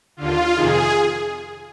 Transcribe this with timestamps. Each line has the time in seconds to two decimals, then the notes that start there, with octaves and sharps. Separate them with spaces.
0.17 D#2 D3 F4
0.54 F2 C3 D#3 G#4